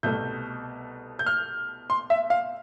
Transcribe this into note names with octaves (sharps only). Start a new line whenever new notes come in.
C2 B2 A3 G6
G6
F6
C6
E5
F5